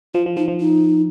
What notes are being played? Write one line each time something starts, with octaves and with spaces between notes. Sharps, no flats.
F3 F4
F3
F3 D#4
F3
D#4